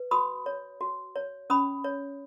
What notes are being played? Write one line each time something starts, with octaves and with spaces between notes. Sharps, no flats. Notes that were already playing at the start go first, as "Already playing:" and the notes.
Already playing: B4
F#4 B5 D#6
C#5
F#4
C#5
C#4 B5 D#6
C#5